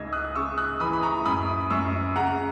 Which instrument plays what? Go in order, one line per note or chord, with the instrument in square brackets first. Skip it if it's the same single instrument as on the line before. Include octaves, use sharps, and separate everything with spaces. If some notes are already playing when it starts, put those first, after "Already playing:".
Already playing: [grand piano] C#2 D#4 E6 G#6 A#6
D#6 F#6
C#3 C#6 E6
D#6 F#6
E3 B5 D#6
B5
A#5 C#6
F#2 B5 D#6
F#2 C#6 E6
C#3 F#5 A#5